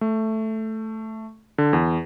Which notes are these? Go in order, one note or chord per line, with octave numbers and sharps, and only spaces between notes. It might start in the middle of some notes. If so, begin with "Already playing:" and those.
A3
D3
E2